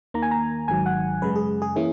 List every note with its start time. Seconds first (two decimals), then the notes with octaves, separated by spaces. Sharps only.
0.14 D#2 D#3 A#3 A#5
0.22 G#5
0.31 A#5
0.68 G#1 G#2 D#3 F#3 G#5
0.86 F#5
1.22 F#2 C#3 G#3 B4
1.36 G#4
1.62 G#4
1.76 E3 A#3 C#4 E4 G#4